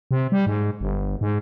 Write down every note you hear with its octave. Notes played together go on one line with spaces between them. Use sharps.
C3
G3
G#2
G1
G#2